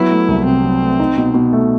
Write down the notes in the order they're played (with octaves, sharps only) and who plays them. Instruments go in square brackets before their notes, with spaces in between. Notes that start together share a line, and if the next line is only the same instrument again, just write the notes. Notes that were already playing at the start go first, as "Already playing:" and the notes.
Already playing: [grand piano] F#3 B3 [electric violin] E4
[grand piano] A3
C2
[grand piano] C3 [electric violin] C4
[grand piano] F#3
A3
D#4
B2
B2
A3